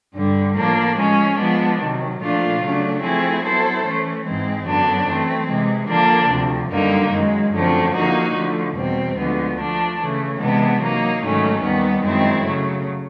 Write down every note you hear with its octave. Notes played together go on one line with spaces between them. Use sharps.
G2 D3 G3
A2 F3 A#3 D4
F3 G#3 C#4
F3 G#3 B3 D4
C3 D#3 F#3
A#2 F3 A3 D4 F4
C#3 F#3 A3 D4
F3 A3 C4 E4 G#4
F#3 B3 E4 A4 C5
E3 A3 C#4
G#2 E3 G#3 C4
F#2 D3 F#3 B3 D4
E3 A3 C4
C3 E3 G#3
D3 F3 A#3 D4
D2 C3 F3
F#2 D3 G3 A#3 D#4
F#2 D#3 G#3
F#2 D3 F3 A3 C4
D3 F3 A#3 D#4 F#4
D3 F3 A3
E2 B2 G3 C4
D2 D3 F3 G#3 B3
F3 A3 D4
C#3 E3 A3
C3 E3 G#3 B3 D4
F#3 A#3 D#4
G#2 D#3 F#3 A3 C#4
D#2 D#3 G3 B3
F#2 D#3 G#3 C4 E4
C#3 F#3 A3